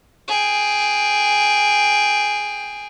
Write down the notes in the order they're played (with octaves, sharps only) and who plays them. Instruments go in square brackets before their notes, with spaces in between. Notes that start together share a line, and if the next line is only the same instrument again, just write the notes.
[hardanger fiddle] G#4 G5